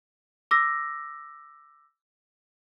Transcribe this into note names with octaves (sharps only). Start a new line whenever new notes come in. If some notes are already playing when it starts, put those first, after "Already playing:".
D6 E6 A#6